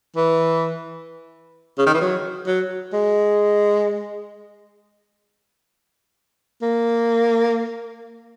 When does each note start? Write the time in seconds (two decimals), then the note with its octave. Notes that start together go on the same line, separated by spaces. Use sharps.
0.16 E3
1.78 C#3
1.86 D#3
1.94 E3
2.01 F#3
2.47 F#3
2.93 G#3
6.62 A#3